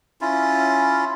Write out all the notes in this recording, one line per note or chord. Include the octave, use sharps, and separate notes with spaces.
C#4 E4 F4